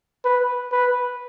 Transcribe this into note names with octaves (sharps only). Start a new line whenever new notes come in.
B4
B4